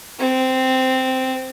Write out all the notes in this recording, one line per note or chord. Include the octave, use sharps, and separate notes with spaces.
C4